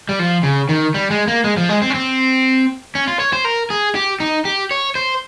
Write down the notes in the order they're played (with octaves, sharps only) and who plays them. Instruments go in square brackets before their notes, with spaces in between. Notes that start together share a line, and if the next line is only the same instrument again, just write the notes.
[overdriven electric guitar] G3
F3
C#3
D#3
G3
G#3
A#3
G#3
F3
G#3
C4
C#4
C4
C#4
F4
C#5
C5
A#4
G#4
G4
D#4
G4
C#5
C5